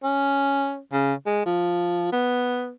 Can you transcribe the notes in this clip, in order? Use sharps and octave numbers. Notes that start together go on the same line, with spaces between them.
C#4
C#3
G#3
F3
B3